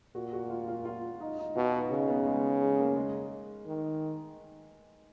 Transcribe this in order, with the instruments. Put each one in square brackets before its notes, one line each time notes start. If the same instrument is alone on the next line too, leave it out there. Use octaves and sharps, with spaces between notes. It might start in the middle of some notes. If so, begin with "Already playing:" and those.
[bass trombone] A#2 [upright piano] F#4
[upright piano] F#4
F4
F4
F4
D#4
D#4
[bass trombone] B2 [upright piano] F4
[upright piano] D#4
[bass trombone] C#3
[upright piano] B3
G#3
G#3
A#3
G#3
[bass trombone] D#3